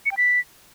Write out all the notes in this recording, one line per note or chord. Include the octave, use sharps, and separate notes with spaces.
C#7
G5
B6